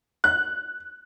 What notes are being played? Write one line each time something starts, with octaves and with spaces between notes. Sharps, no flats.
F#6